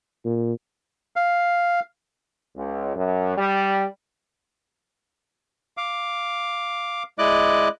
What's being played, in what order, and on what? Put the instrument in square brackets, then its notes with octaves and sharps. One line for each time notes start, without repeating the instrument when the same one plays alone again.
[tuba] A#2
[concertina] F5
[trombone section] C#2
F#2
G3
[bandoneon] F5 D6
G#3 E4 D5 D#5 D6 F#6